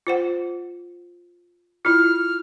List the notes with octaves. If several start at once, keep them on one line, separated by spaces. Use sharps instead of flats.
F4 C5 F#5
E4 F4 F6